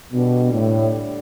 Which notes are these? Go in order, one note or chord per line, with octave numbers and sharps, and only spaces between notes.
B2 D3 G3 D4
A2